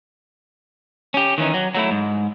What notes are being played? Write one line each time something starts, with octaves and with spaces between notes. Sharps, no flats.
C#4 G4
D#3 E3 C#4 D#4
F#3
F#3 A3 E4
G#2